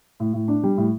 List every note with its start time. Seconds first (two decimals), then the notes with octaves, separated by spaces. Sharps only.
0.20 A2
0.33 A2
0.48 D4
0.63 G3
0.77 A2